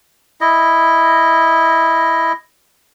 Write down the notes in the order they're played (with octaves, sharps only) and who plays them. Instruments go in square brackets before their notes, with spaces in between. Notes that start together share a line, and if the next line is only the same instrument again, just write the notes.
[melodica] E4 D#5